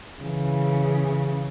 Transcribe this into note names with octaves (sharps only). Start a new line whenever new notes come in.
C#3 E3